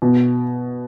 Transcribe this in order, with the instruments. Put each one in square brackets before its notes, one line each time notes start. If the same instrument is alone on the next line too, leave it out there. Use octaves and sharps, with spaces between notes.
[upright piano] B2